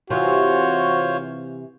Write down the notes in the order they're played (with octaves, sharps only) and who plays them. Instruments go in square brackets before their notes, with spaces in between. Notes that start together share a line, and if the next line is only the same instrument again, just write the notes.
[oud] C3 E3 [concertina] F4 C5 C#5 [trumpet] F#4